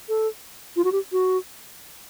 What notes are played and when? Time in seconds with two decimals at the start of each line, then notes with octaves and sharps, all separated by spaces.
0.09 A4
0.76 F4
0.84 F#4
0.92 G4
1.12 F#4